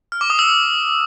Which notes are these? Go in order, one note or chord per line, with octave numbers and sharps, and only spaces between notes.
F6
D6
D#6
E6